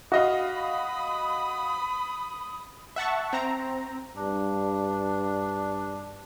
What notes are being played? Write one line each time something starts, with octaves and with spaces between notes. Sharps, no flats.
F#4 D#5 F5 B5 D#6
E5 F#5 A5 C#6
C4 A#5
G2 D4